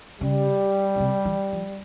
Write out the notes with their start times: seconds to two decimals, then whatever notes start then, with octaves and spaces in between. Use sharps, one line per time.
0.21 C#3 G3
0.95 C#3
1.00 C3
1.25 E3
1.52 F3